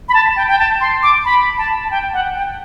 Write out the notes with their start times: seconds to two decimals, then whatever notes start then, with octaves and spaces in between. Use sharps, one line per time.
0.09 B5
0.14 A5
0.36 G5
0.49 G5
0.59 A5
0.81 C6
1.03 D6
1.25 B5
1.58 A5
1.84 A5
1.91 G5
2.13 F#5
2.36 G5